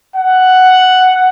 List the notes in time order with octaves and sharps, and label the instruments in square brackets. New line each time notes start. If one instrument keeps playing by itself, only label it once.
[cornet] F#5